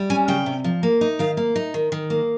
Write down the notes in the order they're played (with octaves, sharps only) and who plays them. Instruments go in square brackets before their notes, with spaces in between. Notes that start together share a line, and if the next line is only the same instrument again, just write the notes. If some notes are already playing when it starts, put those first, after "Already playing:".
Already playing: [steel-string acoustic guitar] G3
C#4 G#5
C#3 G5
C3
F3
A#3
D#4
D#3 F5
A#3
D#4
D#3
D#3
A#3